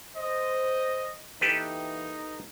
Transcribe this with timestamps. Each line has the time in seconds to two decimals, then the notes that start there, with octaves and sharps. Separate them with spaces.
0.17 C5 D#5
1.41 E3 A#3 D#4 G4 A4 B4